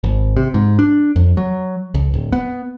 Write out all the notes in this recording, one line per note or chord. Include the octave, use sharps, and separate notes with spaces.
G#1
C3
G#2
D4
F2
F#3
C#2
D1
B3